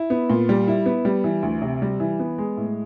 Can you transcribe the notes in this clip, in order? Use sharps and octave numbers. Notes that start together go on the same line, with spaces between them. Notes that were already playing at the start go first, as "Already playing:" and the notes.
Already playing: E4
B3
A#2
G3
E4
B3
G3
E3
D2
C3
G3
E3
B3
G#3
A2